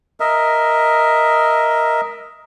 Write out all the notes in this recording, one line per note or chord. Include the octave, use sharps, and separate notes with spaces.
A#4 D#5 E5